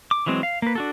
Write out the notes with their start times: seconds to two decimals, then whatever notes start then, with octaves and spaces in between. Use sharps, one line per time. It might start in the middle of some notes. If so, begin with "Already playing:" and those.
0.11 D6
0.26 E3 F#3 G#3 C4
0.43 F5
0.62 A#3 B4
0.75 D4 F#4 A4